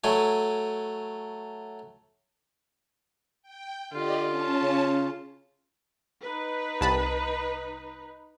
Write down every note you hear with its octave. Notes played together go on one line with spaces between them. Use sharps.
F#3 A3 G#5
G5
D3 F4 G4 D5 D#5
C#4 A5
C#3
D#4 B4
C2 A5 B5